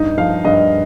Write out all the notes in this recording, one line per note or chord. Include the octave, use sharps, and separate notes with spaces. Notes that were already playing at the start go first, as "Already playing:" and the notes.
Already playing: G2 D#4
F3 F5
G2 D#5